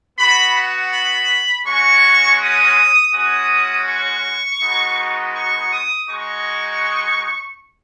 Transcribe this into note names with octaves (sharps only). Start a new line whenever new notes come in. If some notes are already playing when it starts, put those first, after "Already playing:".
B3 F#4 B5
F#5
B5
G#3 C#4 F#4 C#6
D#6
G#3 C#4 F#4 D#6
C#6
G#3 B3 D#4 F#4
C#6
D#6
G#3 D#4 F#4 C#6